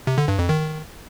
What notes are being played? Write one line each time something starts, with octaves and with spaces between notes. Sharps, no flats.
C3
D3
G2
F2
D#3